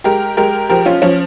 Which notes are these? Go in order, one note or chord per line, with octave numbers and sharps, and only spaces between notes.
G#3 G4 A#4
G#3 G4 A#4
F3 G4 A#4
C#4 F4
F3 C#4